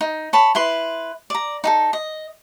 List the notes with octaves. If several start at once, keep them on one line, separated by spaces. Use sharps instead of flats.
D#4
C#5 A5 B5
E4 B4 C6
D5 A#5
D#4 G#4 A4
D#5